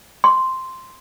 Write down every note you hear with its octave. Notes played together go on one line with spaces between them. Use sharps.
C6